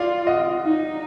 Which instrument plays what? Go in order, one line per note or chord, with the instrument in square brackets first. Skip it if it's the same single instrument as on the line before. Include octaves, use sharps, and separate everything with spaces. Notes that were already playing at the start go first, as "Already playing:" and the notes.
Already playing: [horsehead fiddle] F4 [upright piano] D5 F5
[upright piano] D#5 F#5
[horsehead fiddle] D#4